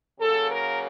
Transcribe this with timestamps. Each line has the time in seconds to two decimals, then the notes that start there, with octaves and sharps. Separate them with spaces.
0.20 C#3 F#3 A#3 A4
0.51 A#4